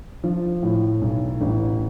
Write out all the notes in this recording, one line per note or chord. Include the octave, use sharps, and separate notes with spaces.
F3
A2
B1
A1